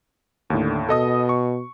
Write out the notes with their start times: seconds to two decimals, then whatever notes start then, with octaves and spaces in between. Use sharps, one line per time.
0.50 D#2 A2 D3
0.89 B2 A4 D#5 D#6
1.29 C#6